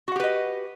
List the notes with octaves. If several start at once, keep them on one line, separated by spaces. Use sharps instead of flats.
F#4 G4 B4 D#5 F#5